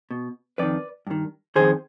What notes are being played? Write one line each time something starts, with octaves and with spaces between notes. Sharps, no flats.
B2
F2 D#3 B4 D5
G2 D#3
F2 C3 D#3 G#4 C5